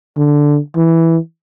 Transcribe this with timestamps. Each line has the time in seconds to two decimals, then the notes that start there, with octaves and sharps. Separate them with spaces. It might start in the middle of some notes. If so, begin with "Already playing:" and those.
0.17 D3
0.76 E3